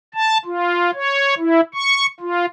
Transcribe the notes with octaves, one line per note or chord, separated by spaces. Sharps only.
A5
F4
C#5
E4
C#6
F4